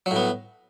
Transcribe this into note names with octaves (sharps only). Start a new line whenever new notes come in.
A2 F#3 B3